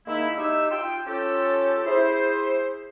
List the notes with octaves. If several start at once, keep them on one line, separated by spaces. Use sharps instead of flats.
D#3 G#3 A#3 D#4 E4
D#4 G4 E5 E6
F4 G5
C#4 F4 G4 A4
E4 G#4 C5